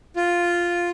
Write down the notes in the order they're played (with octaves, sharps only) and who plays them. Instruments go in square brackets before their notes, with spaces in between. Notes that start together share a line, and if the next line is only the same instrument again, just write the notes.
[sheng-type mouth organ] F4